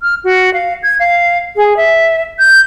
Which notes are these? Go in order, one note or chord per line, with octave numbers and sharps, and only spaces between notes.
F6
F#4
F5
G#6
F5
G#4
E5
G6